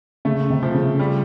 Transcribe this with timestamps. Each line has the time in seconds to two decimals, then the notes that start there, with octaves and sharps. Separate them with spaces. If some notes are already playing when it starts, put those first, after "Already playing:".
0.25 C#3 A3
0.50 C3
0.63 F3
0.75 C#3
0.99 G3